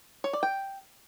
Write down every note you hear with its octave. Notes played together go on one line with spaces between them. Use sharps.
C#5
D5
G5